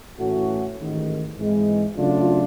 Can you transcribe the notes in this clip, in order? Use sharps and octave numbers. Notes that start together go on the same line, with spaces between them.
A2 E3 A3 C#4 F#4
A1 G#2 D#3
G#2 E3 G#3 C4
C#3 F#3 A3 D4 F4